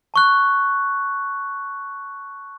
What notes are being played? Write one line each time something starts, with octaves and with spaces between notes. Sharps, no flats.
A5 C#6 F#6